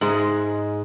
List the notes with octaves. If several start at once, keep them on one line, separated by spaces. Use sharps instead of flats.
G#2 G#3